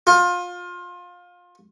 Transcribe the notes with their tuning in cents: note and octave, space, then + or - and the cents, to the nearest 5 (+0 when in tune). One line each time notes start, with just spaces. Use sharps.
F4 +25